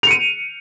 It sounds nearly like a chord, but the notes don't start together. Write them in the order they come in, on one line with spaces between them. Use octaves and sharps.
F7 C#7 D#7